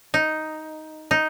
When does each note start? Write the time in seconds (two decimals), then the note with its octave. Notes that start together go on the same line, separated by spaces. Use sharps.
0.14 D#4
1.11 D#4